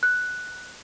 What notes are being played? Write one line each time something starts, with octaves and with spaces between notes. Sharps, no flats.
F#6